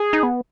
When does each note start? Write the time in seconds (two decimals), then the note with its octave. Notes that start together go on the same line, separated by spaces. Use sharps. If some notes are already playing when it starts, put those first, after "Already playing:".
Already playing: G#4
0.13 D#4
0.23 B3